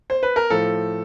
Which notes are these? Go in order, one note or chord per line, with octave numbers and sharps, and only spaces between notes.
C5
B4
A#4
A2 F3 A4